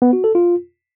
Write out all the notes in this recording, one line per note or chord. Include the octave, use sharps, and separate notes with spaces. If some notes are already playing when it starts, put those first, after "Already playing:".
B3
F#4
A4
F4